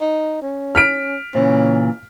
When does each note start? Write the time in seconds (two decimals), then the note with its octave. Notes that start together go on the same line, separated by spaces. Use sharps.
0.01 D#4
0.42 C#4
0.75 F6 B6 D7
1.35 A#2 C#3 E3 C#4